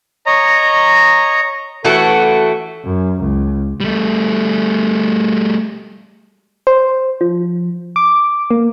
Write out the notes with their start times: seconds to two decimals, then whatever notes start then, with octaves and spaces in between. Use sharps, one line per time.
0.26 C#5 D#5 A#5
1.85 A1 E3 A3 F#4 A4
2.85 F#2
3.20 C#2
3.80 G3 A3
6.67 C5
7.21 F3
7.96 D6
8.51 A#3